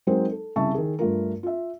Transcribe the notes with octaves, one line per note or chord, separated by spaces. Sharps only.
F#3 G#3 C4 D#4 A#4 C5
A4
C2 C#3 E5 A5 C#6
D#3 G#4
G2 A3 F4 A#4
F4 E5